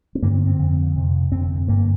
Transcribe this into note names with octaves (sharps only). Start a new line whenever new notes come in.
C4
G2 D3 A#3
C4
C4
F2 D3
F2 C3
F2 D3 C4
G2 D3 A#3